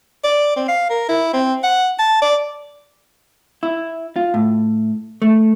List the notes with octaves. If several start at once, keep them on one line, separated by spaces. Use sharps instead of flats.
D5
C4
F5
A#4
E4
C4
F#5
A5
D5
E4
F4
A2
A3